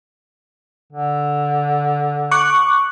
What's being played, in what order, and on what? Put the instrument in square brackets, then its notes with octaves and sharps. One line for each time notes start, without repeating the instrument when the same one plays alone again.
[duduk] D3
[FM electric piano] C#6 D6 F#6